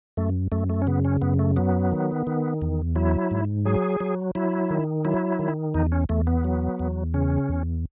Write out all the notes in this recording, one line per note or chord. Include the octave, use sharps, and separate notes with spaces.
F#2 A3
F#2 A3
A3
C#4
C#3 B3
C#4
F#2 B3
A3
F#3 B3
D#3
D#3
E2
F#3 E4
G#2
F#3 G#4
F#3
F#3 E4
D#3
F#3 E4
D#3
E2 D#4
C#4
E2 A3
B3
F#3
E2
C#3 C#4
E2